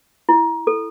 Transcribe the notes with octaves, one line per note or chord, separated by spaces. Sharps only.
E4
A4